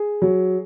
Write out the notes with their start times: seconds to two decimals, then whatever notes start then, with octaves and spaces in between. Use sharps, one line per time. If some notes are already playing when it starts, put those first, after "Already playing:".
Already playing: G#4
0.22 F#3